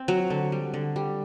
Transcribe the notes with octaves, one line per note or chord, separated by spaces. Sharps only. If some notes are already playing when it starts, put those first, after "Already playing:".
Already playing: C4
F#3
D3
G3
D3
G3